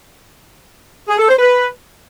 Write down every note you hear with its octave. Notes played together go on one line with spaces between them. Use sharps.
G#4
A4
C5
B4